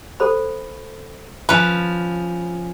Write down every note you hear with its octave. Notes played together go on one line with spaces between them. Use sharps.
A4 C5 B5
F3 C#4 B4